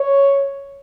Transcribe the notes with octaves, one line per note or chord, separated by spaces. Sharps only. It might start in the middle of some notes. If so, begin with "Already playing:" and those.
Already playing: C#5